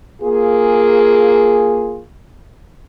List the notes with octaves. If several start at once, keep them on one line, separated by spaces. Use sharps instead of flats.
A#3 F4 G#4